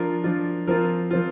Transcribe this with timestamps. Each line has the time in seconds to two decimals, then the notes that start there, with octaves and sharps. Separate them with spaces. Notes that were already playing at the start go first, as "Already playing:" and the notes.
Already playing: F3 D4 F4 A#4
0.24 F3 D4 F4
0.67 F3 C4 F4 A#4
1.11 F3 C4 F4